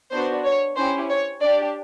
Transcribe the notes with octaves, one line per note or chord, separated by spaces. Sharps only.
B3 D4 F#4 C5
C#5
C#4 E4 G4 C5
C#5
D4 G4 D5